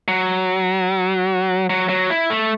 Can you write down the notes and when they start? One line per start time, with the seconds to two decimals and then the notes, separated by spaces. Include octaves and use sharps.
0.08 F#3
1.70 F#3
1.89 F#3
2.10 E4
2.30 A3